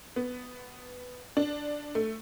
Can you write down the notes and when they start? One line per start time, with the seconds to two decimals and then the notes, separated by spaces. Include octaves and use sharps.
0.16 B3
1.37 D4
1.95 A3